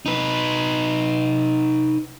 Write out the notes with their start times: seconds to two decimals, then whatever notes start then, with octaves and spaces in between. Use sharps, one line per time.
0.06 D#4 B4